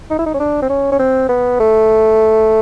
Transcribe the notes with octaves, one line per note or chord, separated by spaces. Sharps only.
D#4
E4
D#4
C#4
D4
C4
C#4
C#4
C4
B3
A3